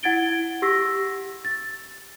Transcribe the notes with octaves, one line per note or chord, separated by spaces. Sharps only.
E4 F#5 G#6 A6 D7 G7
G4 C#6 E6 A#6 B6
A6